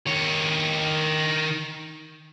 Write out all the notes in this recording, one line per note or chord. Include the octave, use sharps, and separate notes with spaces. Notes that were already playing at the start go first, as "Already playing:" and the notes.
D#3 C#5